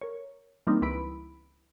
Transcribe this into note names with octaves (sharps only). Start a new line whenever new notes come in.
A#4 C#5
E3 G3 A#3 C4 D4 D#4
C#2 G3 E4 B4 B5 D7